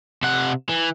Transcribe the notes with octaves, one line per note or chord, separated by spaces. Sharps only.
C3 F#5
E3